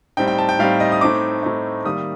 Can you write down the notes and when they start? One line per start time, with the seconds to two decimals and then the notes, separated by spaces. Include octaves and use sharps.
0.17 A2 G3 C4 D#4 G5
0.27 G5
0.39 A5
0.49 G5
0.59 A2 G3 C4 D#4 F5
0.80 D#5
0.92 D#6
1.01 A2 A3 C4 D#4 D6
1.43 A2 A3 C4 D#4
1.85 D#3 G3 A#3 D#6